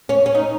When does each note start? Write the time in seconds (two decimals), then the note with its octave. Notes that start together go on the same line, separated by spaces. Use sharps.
0.09 C#4
0.26 C#4
0.35 D#4